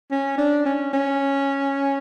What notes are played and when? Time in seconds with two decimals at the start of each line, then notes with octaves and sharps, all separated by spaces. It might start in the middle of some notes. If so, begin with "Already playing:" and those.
0.11 C#4
0.38 D4
0.66 C#4
0.93 C#4